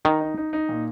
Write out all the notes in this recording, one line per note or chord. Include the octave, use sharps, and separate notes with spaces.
D#3 D#4
D#4
D#4
D#4
A#2